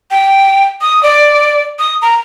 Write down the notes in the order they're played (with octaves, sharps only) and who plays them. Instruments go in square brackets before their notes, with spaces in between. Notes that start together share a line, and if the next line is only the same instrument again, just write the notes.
[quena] G5
D#6
D5
D#6
A#5